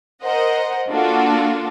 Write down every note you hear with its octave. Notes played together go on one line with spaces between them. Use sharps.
A#4 C5 D#5 F#5
A#3 D4 F4 F#4 A4